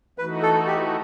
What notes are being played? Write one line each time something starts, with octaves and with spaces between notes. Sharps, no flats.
E3 A3 D#4 F#4 B4
A4
G4